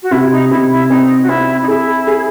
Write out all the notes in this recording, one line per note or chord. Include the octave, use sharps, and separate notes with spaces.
F#4
C3 E4
D#4
C3 E4
E4
C4 D#4
F#4
C4 E4
D#4
E4 G#4
G#4